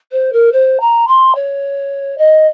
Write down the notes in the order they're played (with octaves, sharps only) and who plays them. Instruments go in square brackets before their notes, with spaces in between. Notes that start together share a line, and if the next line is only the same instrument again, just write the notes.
[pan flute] C5
A#4
C5
A#5
C6
C#5
D#5